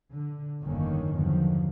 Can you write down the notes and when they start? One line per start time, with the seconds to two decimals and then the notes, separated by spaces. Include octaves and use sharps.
0.10 D3
0.62 G1 F2 D3 D#3 A#3 C#4
1.13 E2 G2 D3 D#3 F3 F#3